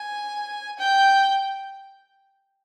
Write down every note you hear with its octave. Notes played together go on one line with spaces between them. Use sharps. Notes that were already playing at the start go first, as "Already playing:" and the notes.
Already playing: G#5
G5